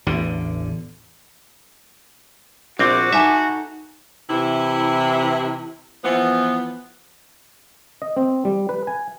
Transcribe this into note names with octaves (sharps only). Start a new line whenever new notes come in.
A1 E2 D3
A#1 C4 F4 F#4 D6
D#4 A4 E5 G#5
C3 E3 E4
E3 F3 B3
D#5
C4
G3
B4
G#5